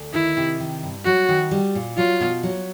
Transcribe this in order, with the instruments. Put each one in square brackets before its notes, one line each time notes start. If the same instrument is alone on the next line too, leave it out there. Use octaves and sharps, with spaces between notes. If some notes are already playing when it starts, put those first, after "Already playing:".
Already playing: [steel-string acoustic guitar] D2
[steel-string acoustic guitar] D#3 [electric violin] E4
[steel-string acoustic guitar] C3
D#3
G2
[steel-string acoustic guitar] F#3 [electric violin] F#4
[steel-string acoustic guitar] D#3
G3
A#2
[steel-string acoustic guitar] F#3 [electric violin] F4
[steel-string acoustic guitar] B2
F#3